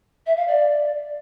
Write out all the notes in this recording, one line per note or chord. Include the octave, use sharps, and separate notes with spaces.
E5
F5
D5